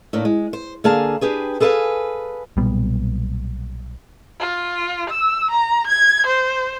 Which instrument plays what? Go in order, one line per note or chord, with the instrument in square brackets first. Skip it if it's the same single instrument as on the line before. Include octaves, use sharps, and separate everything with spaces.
[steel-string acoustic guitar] A2 A3 A#3 D4
G#3
C5
D3 A#3 G#4 F5 A5
D4 G4 G#4 B4
G#4 A4 B4 C#5 F5 G#5
[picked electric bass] B1 A#2 G3 B3
[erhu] F4
E6
A#5
G#6
C5